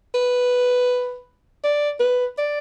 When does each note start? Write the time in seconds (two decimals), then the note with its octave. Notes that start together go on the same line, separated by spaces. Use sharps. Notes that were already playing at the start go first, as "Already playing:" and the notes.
0.14 B4
1.64 D5
2.00 B4
2.38 D5